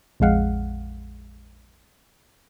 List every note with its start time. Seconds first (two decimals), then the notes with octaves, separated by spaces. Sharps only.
0.20 A#1 F2 G#3 F5 F#5